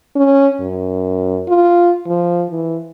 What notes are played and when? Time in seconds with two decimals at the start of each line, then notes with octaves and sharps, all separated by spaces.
0.16 C#4
0.61 F#2
1.48 F4
2.07 F3
2.51 E3